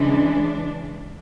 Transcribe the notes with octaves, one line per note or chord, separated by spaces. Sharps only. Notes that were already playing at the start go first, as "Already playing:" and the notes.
Already playing: C#3 E3 G#3 D4